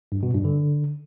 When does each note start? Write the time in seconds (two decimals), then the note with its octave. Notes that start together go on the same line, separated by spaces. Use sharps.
0.12 G2
0.23 B2
0.34 G2
0.45 D3